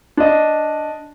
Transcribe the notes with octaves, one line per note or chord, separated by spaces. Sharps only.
D4 D#5